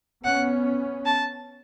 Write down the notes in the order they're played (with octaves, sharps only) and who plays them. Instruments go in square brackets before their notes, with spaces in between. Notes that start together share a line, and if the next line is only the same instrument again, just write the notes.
[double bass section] B3 C#4 [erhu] F#5
[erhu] A5